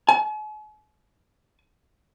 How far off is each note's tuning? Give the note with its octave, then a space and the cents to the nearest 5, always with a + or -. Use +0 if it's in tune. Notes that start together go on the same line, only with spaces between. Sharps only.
G#5 +45